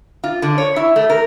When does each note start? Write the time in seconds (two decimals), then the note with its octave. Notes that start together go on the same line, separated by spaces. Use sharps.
0.24 F4
0.42 D3
0.58 C#5
0.76 E4
0.96 A3
1.10 A#4